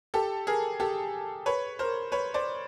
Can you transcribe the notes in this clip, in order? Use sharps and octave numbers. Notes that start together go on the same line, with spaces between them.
G4 A4
G#4 A#4
G4 A4
B4 C#5
A#4 C5
B4 C#5
C5 D5